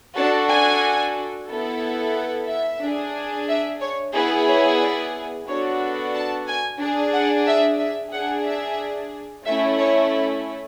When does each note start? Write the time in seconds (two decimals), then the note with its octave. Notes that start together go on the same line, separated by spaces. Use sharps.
0.16 D4 F#4 A4 A5
0.49 G#5
1.49 B3 E4 A4
2.15 F#5
2.49 E5
2.81 D4 G#4
3.49 E5
3.81 C#5
4.14 B3 E4 G#4 B4
4.48 C#5
4.80 D5
5.47 B3 D4 F#4 A4 C#5
6.14 A5
6.47 G#5
6.79 D4 G#4
7.13 F#5
7.47 E5
7.79 E5
8.12 D4 G#4 F#5
8.46 E5
9.45 A3 C#4 E4 E5
9.78 C#5